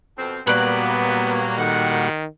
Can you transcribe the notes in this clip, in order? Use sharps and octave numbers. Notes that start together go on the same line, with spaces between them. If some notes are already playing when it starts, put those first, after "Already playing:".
F2 B2 C4
A#2 F#3 G3 A#3 B3 F#4 B4 D5
A2 D#3 F#5